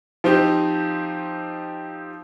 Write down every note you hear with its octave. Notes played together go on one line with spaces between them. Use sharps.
F3 C4 D#4 G4